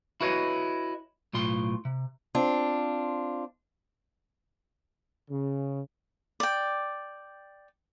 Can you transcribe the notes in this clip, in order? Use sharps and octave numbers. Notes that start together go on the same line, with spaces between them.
E4 F#4 B4 C#5 D#5
B1 A2 F4 C6
C3
C4 D4 F4
C#3
D5 G5